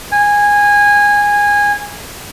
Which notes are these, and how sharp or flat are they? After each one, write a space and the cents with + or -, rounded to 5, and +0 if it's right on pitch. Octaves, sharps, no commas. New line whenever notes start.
G#5 -15